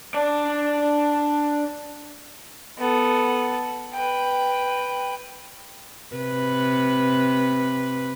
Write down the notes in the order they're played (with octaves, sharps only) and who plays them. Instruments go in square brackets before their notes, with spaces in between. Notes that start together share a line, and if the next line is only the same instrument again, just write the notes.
[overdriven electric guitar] D4 D5
[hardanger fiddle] B3 A4
B4 G5
[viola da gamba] C3 B4